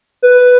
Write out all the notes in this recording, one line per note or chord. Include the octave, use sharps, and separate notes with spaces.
B4